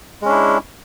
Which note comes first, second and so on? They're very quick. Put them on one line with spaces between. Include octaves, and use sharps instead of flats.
G#3 C#4 D4 E4